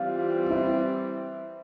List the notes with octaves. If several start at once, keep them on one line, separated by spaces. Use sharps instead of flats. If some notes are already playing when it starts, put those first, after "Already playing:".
Already playing: E3 G3 C4 F4
E4